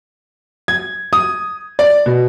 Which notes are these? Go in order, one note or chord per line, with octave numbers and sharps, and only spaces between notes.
G#6
D#6
D5
B2